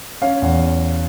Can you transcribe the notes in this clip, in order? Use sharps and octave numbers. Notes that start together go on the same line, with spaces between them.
C#4 F5
E2